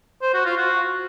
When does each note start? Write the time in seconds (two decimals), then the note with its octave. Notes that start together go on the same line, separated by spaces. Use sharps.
0.22 C5
0.34 F#4
0.45 F4
0.57 F#4